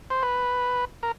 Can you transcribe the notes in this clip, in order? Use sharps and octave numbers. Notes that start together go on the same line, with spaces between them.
C5
B4
A#4